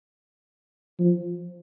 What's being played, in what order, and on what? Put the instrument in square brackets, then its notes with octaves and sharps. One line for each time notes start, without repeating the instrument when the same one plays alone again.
[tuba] F3